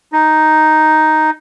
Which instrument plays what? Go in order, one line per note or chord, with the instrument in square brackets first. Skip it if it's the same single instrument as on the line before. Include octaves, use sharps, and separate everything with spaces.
[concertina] D#4